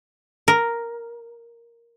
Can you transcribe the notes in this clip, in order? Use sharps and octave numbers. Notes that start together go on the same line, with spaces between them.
A#4